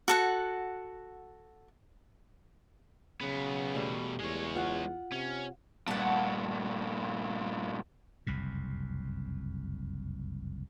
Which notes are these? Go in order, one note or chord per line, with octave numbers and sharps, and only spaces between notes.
F#4 A4 F#5
C#3 F#3 B3
E2 B2 G3 A3
E2 G#3 C#5
F4 F#5
C3 C#4
G2 A#2 F#5 A5
F#1 C2 F2 C3